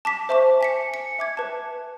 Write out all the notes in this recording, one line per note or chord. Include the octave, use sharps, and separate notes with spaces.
A5 D6 B6
C5 E5 A5 C#6 D6
G#5 B6 C#7
C#7
E5 D6 G#6
B4 A5